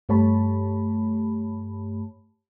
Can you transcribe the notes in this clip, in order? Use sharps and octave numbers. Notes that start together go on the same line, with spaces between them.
G2 A3 G4 C#5 A5 B5